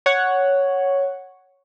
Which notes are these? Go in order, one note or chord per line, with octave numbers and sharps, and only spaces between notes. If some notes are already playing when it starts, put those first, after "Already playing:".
C#5 F#5